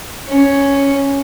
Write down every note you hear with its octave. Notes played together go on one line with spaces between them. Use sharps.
C#4